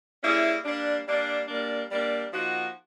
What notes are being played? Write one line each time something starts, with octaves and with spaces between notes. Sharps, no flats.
G3 A#3 C#4 E4 G#4
G3 A#3 D4
G3 A#3 D4
G3 A#3 D4
G3 A#3 D4
F3 A#3 D#4 F#4